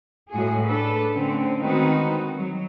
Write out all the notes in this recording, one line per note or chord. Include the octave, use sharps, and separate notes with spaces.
A2 G#3 F#4 G#4
D4 A4 B4
D3 A3 C4 C#4
D#3 G#3 C4 D#4 F#4 B4
F#3